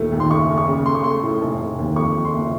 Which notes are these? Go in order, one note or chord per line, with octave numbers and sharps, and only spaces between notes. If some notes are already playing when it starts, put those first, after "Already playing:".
Already playing: D#2 A#2 A3
D#2
C6
F#1 C#6
F#1
C#6
C#3
A3 C6
C#6
A3 C6
A2
F1
F1
D#2
F2 C#6
F3
C6
F#1